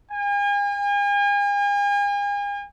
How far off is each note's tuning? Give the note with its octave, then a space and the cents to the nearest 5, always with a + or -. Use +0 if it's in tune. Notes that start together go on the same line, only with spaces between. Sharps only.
G#5 -40